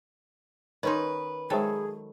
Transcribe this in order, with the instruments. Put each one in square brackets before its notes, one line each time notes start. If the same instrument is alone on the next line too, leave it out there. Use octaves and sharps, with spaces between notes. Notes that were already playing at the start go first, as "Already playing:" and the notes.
[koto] D#3 C#4 D#4 [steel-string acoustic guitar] B4 [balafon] C#5 C6
[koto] D#3 F#3 A4 [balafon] G#3 C5 G5 [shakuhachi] G#4